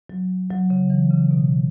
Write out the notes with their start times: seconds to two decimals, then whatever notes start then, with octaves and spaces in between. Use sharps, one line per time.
0.10 F#3
0.50 F#3
0.70 C#3
0.90 E3
1.10 C#3
1.31 B2